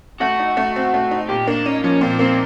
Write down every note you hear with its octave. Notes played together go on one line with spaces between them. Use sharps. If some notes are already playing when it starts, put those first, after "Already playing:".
A3 F#4
D#4
A3
C4
A3
D#4
A#2 G4
A#3 D4
C#4 D#4
F3 C#4
A#2 C4
A#3 C4